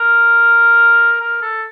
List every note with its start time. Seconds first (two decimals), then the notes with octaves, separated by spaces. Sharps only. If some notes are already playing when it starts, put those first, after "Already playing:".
Already playing: A#4
1.21 A#4
1.42 A4